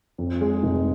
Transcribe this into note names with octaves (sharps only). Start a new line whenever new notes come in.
F2
G#3
F1